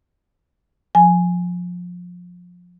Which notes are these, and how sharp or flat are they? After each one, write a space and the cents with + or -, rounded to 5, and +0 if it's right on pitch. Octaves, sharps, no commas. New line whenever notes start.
F3 +25 G#5 +0